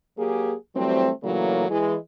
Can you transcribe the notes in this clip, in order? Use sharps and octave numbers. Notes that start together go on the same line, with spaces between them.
F#3 A#3 G4 G#4
E3 F#3 G3 A3 C4
A#2 C#3 E3 F#3 A3 A#3
E3 G#3